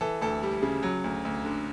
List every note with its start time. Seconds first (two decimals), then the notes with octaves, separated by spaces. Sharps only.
0.01 E3 A4
0.21 D2 A4
0.43 G3
0.63 C#3
0.83 F#3
1.04 D2
1.25 D2
1.45 D3